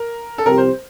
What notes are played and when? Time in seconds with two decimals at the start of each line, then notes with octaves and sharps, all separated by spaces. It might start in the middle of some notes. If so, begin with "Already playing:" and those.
Already playing: A#4
0.38 A4
0.46 C2 C3 F3 C4 G4 A#4
0.57 C5